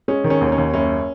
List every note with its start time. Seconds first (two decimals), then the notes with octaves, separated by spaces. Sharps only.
0.08 G#3 C#4
0.24 D#3
0.30 C#4
0.41 D#2
0.52 C#4
0.58 D#2
0.73 F#1 C#4